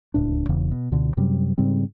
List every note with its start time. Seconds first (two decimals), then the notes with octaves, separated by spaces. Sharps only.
0.14 D1 C#2 A2 D4
0.49 E1 E2 C#3 E3
0.72 B2
0.91 C#2 B2 D3
1.17 F#2 C3 F#3 G3
1.58 G#2 C#3 G3 C4